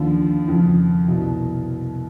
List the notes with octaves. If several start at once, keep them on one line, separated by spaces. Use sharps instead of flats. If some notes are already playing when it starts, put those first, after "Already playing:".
Already playing: D#2 D3 F3
F2 C#3 F3
C2 B2